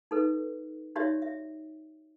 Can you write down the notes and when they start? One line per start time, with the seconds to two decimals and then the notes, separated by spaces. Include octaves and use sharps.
0.11 D#4 A4 B4
0.96 D#4 F#4 G4 C#5 D5 E5
1.22 E5